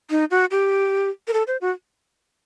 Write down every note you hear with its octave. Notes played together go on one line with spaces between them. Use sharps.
D#4
F#4
G4
A#4
A4
C5
F#4